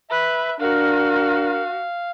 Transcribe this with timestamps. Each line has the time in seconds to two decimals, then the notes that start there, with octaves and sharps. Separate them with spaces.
0.10 B4 E5
0.60 D4 F#4 A#4 F5